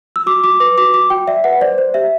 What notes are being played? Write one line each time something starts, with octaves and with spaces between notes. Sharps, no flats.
E6
F#4 D6
F#4 D6
B4 D6
F#4 D6
F#4 D6
F#4 G5
D5 E5
B4 F#5
C5 D5
C5
G4 E5